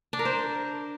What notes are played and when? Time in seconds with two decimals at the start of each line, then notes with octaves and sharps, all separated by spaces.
0.13 D4
0.19 A#4
0.25 C5